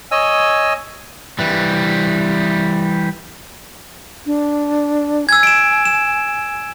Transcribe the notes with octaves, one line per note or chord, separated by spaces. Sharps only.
C#5 D#5 G#5 E6
E3 G3
D4
G#5 E6 G#6
D7 E7
E7